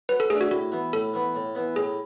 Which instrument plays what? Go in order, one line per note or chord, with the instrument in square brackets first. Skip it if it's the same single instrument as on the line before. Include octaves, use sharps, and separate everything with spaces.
[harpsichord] F#3 [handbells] B4
[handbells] A4
[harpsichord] A3 D4 A4 [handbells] G#4
[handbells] F#4
[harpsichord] A2 [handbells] F#4
[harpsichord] E3 B3
[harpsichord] A2 [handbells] A4
[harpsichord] E3 B3
A2
E3 B3
[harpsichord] A2 [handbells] G#4